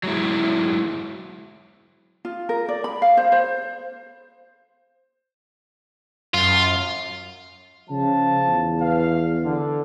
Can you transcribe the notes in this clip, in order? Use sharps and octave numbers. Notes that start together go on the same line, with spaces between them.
F#3 G#3 E4
F4
A#4
D5
B5
F5
C5
C5
F#2 F4
C#3 F3 A5
E2
B4 F5
D3